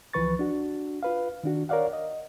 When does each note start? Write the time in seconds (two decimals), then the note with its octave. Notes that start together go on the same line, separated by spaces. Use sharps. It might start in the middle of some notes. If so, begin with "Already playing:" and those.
0.13 C#2 E3 F3 B4 C#6 A6
0.39 D4 F#4
1.03 F4 B4 F5
1.44 D#3 D4 F#4
1.69 A#4 C#5 D5 F5 F#5
1.93 D#5